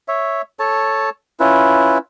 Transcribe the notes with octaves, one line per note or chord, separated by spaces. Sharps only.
C#5 E5
A4 C#5 A5
C#4 E4 F4 B4